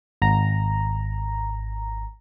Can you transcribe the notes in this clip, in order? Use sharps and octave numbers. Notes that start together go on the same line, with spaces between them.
G#1 A#5